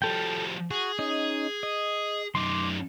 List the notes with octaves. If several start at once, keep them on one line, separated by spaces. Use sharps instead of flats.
F3 G3 A4 G5
F#4 G#4
C#4 D#4 D#5
D#5
F#2 D#4 C6 D6